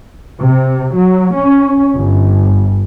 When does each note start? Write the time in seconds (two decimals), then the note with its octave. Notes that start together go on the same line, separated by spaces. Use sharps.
0.40 C3
0.95 F#3
1.34 C#4
1.96 G1